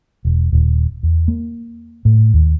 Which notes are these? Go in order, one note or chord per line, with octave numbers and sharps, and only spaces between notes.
E1
D#1
E2
A#3
A2
D#2